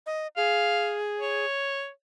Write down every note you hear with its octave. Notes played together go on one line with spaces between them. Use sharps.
D#5
G#4 F5
C#5